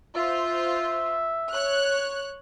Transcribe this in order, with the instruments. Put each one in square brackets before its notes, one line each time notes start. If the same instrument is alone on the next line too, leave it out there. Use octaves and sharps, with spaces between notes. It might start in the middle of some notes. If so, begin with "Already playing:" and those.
[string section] F4 C5 [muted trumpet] E5
[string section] C#5 F#6